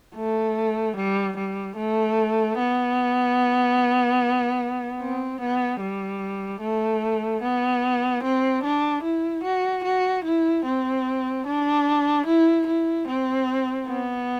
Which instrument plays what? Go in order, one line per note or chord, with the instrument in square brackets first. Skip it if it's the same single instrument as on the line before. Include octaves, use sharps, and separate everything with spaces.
[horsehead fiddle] A3
G3
G3
A3
B3
C4
B3
G3
A3
B3
C4
D4
E4
F#4
F#4
E4
C4
D4
E4
E4
C4
B3